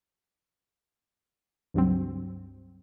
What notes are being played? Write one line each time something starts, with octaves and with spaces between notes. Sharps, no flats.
C#2 G2 F#3 C4